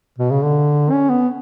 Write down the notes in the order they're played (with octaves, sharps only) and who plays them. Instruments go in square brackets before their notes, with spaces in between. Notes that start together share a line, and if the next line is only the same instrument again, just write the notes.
[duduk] B2
C#3
D3
C#4
B3